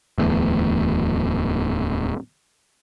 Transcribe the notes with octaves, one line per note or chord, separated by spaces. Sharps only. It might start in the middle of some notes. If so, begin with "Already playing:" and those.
D1 E2 A2